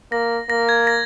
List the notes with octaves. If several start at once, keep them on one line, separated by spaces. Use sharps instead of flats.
A#3 A#6
A#3 A#6
G#6
A#6